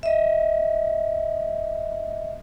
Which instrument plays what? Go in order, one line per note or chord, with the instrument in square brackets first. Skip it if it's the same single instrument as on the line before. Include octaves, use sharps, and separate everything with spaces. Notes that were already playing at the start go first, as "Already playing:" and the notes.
[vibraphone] D#5 E5